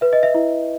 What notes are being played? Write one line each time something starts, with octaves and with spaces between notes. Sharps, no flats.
B4 E5
D#5
E5
E4